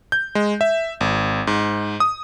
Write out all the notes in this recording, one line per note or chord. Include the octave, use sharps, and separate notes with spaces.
G6
G#3
E5
G#1
G#2
D#6